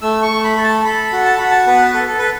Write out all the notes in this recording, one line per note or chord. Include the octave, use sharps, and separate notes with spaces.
A3 E6
C#6
A3
B5
A4
A5
A4 B5
F#4
A5
F#4 B5
A5
B3 B4
A4
A4
A4 B4